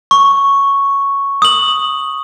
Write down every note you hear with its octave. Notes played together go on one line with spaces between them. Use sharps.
C#6
D#6 F#7